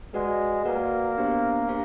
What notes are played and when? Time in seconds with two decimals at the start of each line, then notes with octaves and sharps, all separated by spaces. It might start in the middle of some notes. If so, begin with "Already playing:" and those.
0.14 G#3 F#4 B4 D5 F#5
0.65 A#3 F#4 B4 D5 F#5
1.17 B3 D4 G4 C5 F5
1.69 D4 G4 C5 F5